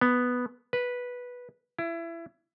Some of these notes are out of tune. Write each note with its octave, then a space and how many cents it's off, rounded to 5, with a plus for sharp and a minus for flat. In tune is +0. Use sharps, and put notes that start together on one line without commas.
B3 +0
B4 -10
E4 +25